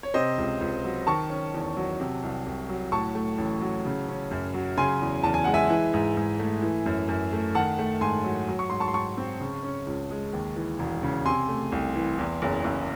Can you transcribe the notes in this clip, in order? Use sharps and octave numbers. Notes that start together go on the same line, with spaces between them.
C#5
C3 C5 D#5
C#2
C#2
F#3
D#3 A5 C#6
C#4
E2
F#3
C3
C2
C2
F#3
A2 A5 C#6
A3
A1
F#3
C#3
C#4
F#2
F#3
C#3 G#5 C6
E2
E2 A5
G#5
G#3 F#5
E5 G#5
E3
G#2
G#2
A3
E3
F#2
F#2
A3
D#3 F#5 A5
A3
G#2 G#5 C6
F#3
F#3
C#6
G#2 C6
A5 C#6
C6
G#2 A5 C#6
C4
C#3
C#4
C#2
G#3
D#2
E3
E1
C#3
C3 G#5 C6
A3
C2
E3
E2
F#1
F#1